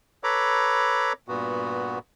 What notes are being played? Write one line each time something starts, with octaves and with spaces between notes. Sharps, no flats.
A4 B4 C#5 A#5 B5 D6
G2 A#2 B3 F#4